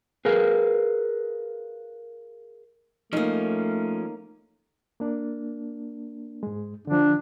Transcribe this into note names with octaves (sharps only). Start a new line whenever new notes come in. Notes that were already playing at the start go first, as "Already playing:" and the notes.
G#4 A#4 B4 F5
F3 A3 A#3 C#4 D#4
A#3 D4
G#2 G#3
D3 F3 D4